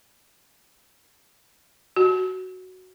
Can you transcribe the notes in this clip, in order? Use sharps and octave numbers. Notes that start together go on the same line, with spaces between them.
F#4